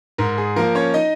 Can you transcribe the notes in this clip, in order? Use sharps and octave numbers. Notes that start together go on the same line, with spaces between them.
G#2 A#4
G#4
F3 A#3 A#4
C#4 C#5
D#4 D#5